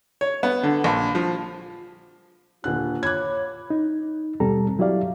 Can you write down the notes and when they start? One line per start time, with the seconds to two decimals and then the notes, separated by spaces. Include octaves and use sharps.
0.21 C#5
0.43 B3
0.63 D3
0.84 A#1
1.15 F3
2.64 D#1 D3 F4 F#6
3.03 C#5 B5 D6 F#6 G#6
3.70 D#4
4.40 D#2 B2 G3 C4 A4 A#5
4.79 F#3 E4 G4 D5 F5